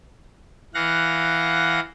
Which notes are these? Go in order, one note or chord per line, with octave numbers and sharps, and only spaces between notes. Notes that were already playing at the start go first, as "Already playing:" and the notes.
E3 F5 F#5 A#6